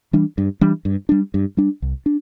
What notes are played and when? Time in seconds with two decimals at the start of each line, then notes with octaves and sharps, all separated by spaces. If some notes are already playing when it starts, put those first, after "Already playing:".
0.13 E3 G3 D4
0.38 G2
0.61 E3 G3 D4
0.85 G2
1.09 G3 D4
1.34 G2
1.57 G3 D4
1.82 C2
2.06 D4